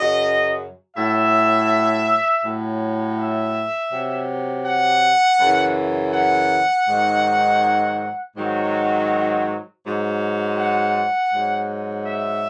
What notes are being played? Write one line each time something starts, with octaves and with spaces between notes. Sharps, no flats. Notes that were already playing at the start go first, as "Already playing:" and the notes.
Already playing: F#2 C#3 F#3 D#5
A2 F#3 E5
A2 F#3
E5
C3 F#3
F#5
F#2 C#3 E3
F#5
G#2 D#3 F#3
G#2 D#3 F#3
G#2 F#3
F#5
G#2 F#3
E5